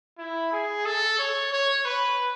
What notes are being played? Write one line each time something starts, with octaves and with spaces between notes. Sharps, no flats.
E4
G#4
A4
C#5
C#5
B4